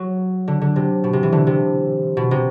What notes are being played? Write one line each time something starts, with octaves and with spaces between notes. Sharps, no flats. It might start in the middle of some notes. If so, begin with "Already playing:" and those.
Already playing: F#3
D3
D3
C3
B2
C3
E3
D3
C3
B2
C3